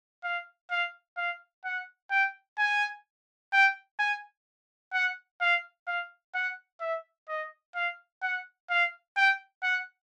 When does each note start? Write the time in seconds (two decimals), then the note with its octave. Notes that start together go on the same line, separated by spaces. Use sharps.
0.24 F5
0.71 F5
1.17 F5
1.64 F#5
2.11 G5
2.58 G#5
3.53 G5
3.99 G#5
4.93 F#5
5.41 F5
5.87 F5
6.34 F#5
6.81 E5
7.28 D#5
7.75 F5
8.22 F#5
8.70 F5
9.17 G5
9.63 F#5